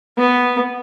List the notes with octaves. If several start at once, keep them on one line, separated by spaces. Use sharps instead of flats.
B3